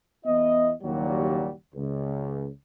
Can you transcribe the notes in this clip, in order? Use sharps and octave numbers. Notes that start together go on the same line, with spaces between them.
E2 B3 E4 D#5
F#1 D#2 A#2 F#3 G3 F#4
C#2